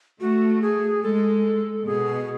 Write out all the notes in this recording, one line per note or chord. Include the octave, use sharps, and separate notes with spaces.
A3 F#4
G#4
G#3 A4
B2 G#4